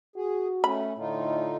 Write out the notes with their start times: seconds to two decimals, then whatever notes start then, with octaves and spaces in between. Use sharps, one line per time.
0.16 F#4 G#4
0.64 A3 C#4 B5
0.98 A2 D3 D#4 F4